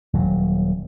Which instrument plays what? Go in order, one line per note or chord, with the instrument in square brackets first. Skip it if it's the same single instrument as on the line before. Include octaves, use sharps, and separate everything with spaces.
[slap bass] D#1 F#3